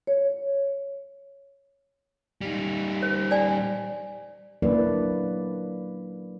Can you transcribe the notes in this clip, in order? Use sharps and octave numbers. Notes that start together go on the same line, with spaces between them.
C#5
G3 D#4
C5
D5 G#5
F#3 A#3 D4 E4 B4 D5